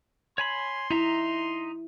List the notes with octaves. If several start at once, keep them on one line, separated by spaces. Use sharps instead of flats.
C#5 G#5 B5 C6
D#4 E4 E5 A#5